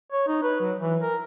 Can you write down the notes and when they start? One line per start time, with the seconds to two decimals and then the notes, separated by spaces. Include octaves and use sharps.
0.12 C#5
0.27 D#4
0.43 B4
0.61 F#3
0.80 E3
1.01 A#4